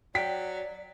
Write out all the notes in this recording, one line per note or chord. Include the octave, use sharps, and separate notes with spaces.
F#3 D5 G5 B6